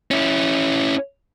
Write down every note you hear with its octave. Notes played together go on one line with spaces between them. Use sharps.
C#4 E4